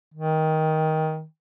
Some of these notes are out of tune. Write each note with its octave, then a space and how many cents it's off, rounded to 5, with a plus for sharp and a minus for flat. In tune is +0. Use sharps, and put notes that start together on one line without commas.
D#3 +15